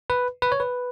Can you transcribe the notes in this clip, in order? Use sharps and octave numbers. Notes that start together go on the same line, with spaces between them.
B4
B4
C#5
B4